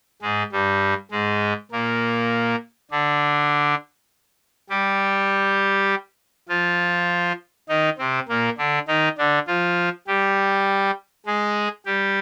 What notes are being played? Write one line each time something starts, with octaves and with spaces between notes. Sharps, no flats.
G#2 G#3
G2 G3
G#2 G#3
A#2 A#3
D3 D4
G3 G4
F3 F4
D#3 D#4
C3 C4
A#2 A#3
D3 D4
D#3 D#4
D3 D4
F3 F4
G3 G4
G#3 G#4
G3 G4